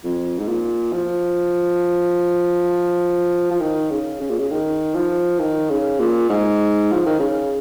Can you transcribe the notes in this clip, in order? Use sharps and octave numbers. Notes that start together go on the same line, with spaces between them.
F2
G#2
A#2
F3
F3
D#3
C#3
C#3
A#2
C#3
D#3
F3
D#3
C#3
A#2
G#2
F3
D#3
C#3